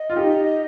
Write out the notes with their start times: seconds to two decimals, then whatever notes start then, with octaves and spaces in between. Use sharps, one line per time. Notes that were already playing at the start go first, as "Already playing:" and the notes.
Already playing: D#5
0.10 F4
0.16 D#4 G4